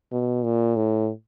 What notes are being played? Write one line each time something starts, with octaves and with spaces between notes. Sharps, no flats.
B2
A#2
A2